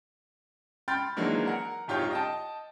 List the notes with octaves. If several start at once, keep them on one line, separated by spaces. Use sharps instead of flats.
G5 B5 C6 F6 G6 A6
D#3 E3 F#3 G#3 A#3 D4
A#4 F#5
D1 G#2 F4 G4 C#5 G6
D#5 G5 A5